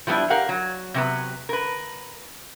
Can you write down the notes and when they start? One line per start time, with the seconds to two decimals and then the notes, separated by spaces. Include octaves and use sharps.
0.07 F3 G3 B3 D4 E4
0.30 G4 A#4 F5 F#5
0.49 F#3
0.94 C3 F#3 B3
1.49 A#4 B4